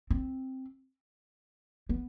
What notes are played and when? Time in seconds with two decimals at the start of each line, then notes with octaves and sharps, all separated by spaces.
0.10 C4
1.89 B3